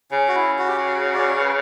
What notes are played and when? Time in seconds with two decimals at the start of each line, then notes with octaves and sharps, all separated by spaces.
0.11 C#3 C#4
0.28 F#4
0.35 E4
0.59 F#4
0.68 G4
0.77 F#4
1.15 D5
1.28 C#5
1.40 B4